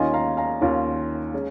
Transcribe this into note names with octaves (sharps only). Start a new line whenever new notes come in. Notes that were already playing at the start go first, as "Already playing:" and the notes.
Already playing: D#2 D#3 C#4 F4 D#5 G#5
F5 A#5
F5 A#5
D#2 D#3 C#4 F4
G#3 C#4